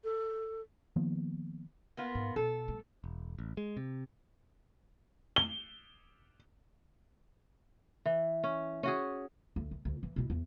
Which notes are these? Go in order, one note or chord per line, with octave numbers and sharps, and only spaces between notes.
A4
D#3 F3 A#3 B3
A#3 B3 F4
G#2
B2 A4
G3 A3
E1
A1
G#3
C3
G7
E3
C#4
C#4 F#4 G#4
D2
D#3
D2
E3
B2 E4
E2